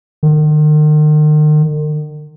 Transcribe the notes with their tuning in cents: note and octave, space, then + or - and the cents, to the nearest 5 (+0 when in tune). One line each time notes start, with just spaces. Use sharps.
D#3 -40